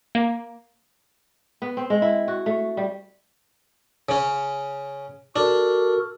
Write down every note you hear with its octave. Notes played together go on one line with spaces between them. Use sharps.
A#3
B3
C4
G#3
E4
F#4
A3
G3
C#3 C#4
D4 F#4 A4 A#4